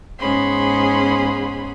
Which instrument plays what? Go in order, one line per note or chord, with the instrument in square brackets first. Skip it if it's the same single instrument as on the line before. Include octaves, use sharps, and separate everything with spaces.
[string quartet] G#2 B3 C#4 G#4 B5 C6